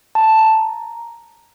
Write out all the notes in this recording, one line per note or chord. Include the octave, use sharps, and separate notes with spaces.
A5
A#5